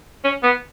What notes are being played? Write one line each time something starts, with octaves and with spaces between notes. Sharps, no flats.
C#4
B3